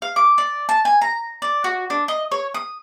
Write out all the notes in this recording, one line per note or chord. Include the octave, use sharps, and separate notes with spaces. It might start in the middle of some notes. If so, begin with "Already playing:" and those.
F5
D6
D5
A5
G#5
A#5
D5
F#4
D4
D#5
C#5
D#6